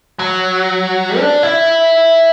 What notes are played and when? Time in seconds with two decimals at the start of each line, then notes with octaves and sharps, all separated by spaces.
0.19 F#3
1.18 D4
1.43 E4